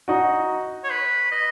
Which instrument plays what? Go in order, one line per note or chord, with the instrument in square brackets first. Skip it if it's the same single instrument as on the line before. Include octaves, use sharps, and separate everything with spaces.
[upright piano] D#4 F#4
[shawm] C#5
B4
D#5